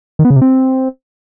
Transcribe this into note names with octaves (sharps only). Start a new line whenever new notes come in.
D#3
B3
C#3
C3
C4